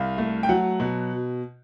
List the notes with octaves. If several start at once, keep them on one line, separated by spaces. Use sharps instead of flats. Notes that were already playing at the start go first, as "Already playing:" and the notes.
Already playing: C2 F5
A3
G5
F#3 F#5
B2